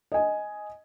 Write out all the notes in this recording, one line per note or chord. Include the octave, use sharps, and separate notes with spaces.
D#5 G#5